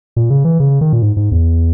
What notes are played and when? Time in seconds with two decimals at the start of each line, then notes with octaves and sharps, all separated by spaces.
0.16 A#2
0.30 C#3
0.45 E3
0.60 C#3
0.81 D#3
0.93 A#2
1.02 G#2
1.17 G#2
1.32 E2